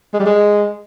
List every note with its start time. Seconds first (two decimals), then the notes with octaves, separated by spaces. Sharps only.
0.14 G#3
0.20 G3
0.26 G#3